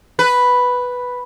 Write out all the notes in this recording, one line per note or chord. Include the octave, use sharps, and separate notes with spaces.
B4